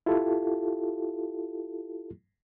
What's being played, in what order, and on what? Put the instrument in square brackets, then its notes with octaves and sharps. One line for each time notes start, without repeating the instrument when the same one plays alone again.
[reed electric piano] E4 F4 G4 A4